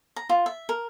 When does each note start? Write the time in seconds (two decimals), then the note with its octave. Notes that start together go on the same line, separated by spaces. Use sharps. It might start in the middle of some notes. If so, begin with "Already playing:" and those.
0.16 A#5
0.29 F4
0.46 E5
0.69 A#4